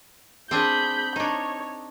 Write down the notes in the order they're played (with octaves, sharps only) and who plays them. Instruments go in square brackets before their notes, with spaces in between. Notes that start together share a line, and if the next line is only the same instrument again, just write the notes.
[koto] C4 D4 G#4 [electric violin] B5 G6
[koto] D4 D#4 [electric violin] C#5